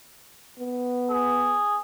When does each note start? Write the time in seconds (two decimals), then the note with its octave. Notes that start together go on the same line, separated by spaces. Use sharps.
0.59 B3
1.11 G#4